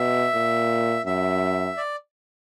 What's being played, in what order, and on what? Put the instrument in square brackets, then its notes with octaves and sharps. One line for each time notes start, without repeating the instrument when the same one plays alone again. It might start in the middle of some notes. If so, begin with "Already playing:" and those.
Already playing: [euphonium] B2 [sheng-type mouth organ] E5
[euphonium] A#2
[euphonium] F#2 [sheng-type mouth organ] E5
[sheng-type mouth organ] D5